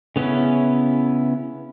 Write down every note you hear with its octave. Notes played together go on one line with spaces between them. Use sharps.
C#3 B3 C#4 E4